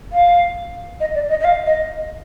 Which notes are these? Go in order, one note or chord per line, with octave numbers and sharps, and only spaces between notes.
F5
D#5
D5
D#5
D#5
F5
D#5